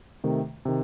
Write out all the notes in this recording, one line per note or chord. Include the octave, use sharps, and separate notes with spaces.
C3 D#3 A3
C3 D#3